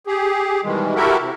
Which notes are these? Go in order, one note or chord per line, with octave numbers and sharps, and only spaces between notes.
G4 G#4
B2 D#3 E3 G3 G#3
E4 F#4 G4 A4 A#4 E5
C3